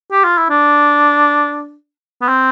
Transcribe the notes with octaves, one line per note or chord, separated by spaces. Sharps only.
G4
F4
E4
D4
B3
C4